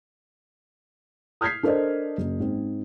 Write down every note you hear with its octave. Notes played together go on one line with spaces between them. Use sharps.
D#6 F6 G6 G#6 B6 C7
D4 A4 A#4 C5 D5 D#5
F#1
G#2 C4